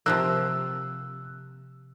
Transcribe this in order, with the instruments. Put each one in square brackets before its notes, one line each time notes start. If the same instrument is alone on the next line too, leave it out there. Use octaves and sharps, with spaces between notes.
[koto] C3 F3 A#3 [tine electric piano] E6 F#6